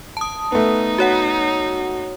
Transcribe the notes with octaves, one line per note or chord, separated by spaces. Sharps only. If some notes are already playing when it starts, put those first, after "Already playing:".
A5 D#6
A3 B3 D#4
F#4 C#5 F#5